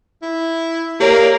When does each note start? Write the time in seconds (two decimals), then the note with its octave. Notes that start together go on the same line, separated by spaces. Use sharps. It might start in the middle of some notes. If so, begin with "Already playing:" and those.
0.22 E4
1.00 A#3 G4 A#4 C#5 D5